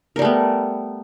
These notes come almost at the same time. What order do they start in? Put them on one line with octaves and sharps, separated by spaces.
A#4 G3 A3 B3